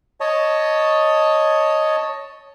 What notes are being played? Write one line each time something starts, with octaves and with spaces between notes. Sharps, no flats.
C#5 D#5 A5